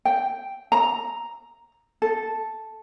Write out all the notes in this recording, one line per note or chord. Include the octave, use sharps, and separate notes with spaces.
G5
A#5
A4